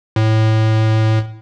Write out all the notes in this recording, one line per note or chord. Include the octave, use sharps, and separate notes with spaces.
A2